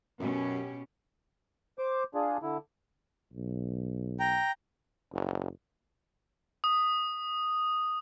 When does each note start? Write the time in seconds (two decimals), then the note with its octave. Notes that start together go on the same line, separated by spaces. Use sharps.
0.20 F#2 B2 C#4 G4
1.79 C5 D6
2.15 D4 F4 G#4
2.42 D3 E4
3.33 B1
4.20 G5 A#5
5.12 F#1
6.64 D#6